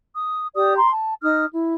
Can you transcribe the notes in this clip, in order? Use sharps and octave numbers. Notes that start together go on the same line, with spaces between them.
D#6
G4 D5 D#6
A#5 C6
A5
D#4 D#6 F6
E4